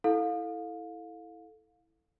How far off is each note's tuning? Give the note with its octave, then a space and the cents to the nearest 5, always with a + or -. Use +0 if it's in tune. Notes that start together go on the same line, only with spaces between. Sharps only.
E4 -10 A4 +0 F5 +25